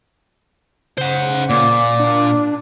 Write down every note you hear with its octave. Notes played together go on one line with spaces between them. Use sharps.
C#3 C5 F#5
A#2 D5
D4